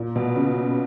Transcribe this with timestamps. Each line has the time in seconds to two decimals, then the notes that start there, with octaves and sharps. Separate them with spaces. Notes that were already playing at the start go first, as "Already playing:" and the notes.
Already playing: A#2
0.16 B2
0.36 C#3